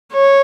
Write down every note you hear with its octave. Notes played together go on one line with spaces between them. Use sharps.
C#5